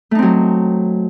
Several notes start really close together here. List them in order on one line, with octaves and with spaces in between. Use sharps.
A3 D#4 C4 F#3